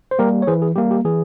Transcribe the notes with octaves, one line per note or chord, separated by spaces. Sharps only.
C5
G3 A#3 G4 A#4
C#5
E3 G#4 C5
G#4
G3 A#3 G4
G4
E3 G#4